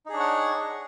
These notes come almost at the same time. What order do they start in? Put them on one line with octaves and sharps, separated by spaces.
D#4 G#4 D4 C#5 F#5